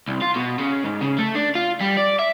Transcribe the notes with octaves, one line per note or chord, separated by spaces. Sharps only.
C2
F4
B2
C#3
G#2
C#3
A3
D4
F4
G3
D5
E5